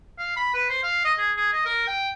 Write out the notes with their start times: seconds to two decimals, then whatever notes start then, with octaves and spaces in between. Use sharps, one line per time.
0.18 F5
0.37 B5
0.53 B4
0.69 C5
0.83 F5
1.05 D#5
1.18 G#4
1.37 G#4
1.53 D#5
1.65 A#4
1.87 G5